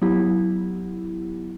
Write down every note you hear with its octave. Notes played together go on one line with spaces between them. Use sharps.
F#3 B3 E4 G4